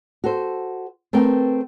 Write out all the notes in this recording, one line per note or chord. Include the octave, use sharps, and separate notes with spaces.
F#4 A4 C5
A3 C4 A#4 B4 G5